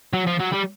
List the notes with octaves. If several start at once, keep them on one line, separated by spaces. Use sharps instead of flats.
F#3
F3
F#3
G3